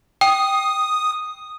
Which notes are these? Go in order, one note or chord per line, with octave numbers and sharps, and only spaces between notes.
G5 D#6